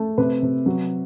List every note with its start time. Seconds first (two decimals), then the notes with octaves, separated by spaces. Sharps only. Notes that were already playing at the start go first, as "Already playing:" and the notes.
Already playing: A3
0.18 C3 B4
0.42 C3
0.66 F#3